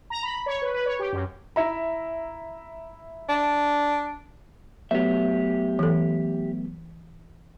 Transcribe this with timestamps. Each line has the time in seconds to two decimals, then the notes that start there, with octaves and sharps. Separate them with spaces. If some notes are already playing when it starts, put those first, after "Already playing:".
0.10 A#5
0.23 B5
0.46 C#5
0.62 B4
0.74 B4
0.86 C#5
0.99 G4
1.13 F#2
1.56 E4 E5 A#5
3.29 D4
4.91 F#3 A3 B3 G4 E5
5.79 E3 A4